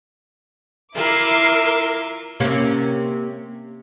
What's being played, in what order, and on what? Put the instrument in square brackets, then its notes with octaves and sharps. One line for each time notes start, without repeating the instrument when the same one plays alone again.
[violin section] E4 D6 C7 [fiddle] F4 E5 [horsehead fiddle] A#4
[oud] C3 A#3 C#4